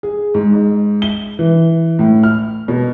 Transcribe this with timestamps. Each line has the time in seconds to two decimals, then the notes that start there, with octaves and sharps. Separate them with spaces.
0.03 G#4
0.34 G#2
0.54 G#2
1.02 G7
1.39 E3
1.99 A2
2.23 F6
2.68 B2